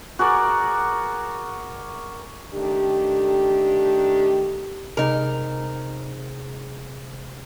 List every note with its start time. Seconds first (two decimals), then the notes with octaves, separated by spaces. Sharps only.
0.19 F#4 G#4 A#4 D5
2.54 D#3 A3 D4 G4
4.97 C3 G#3 D#4 G#4 A#4